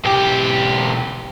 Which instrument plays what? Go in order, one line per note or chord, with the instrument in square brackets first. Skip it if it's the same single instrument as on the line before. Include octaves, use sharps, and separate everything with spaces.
[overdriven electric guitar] B1 G4